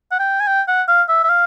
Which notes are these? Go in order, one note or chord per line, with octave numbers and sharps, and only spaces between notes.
F#5
G5
G#5
G5
F#5
F5
E5
E5
F5